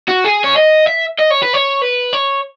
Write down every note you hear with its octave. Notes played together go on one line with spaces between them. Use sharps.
F#4
G#4
C#5
D#5
E5
D#5
C#5
B4
C#5
B4
C#5